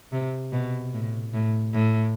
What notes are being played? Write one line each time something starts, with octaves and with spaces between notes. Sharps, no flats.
C3
B2
A2
A2
A2